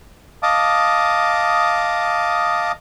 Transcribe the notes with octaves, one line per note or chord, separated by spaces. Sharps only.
D#5 F5 A5 D6 D#6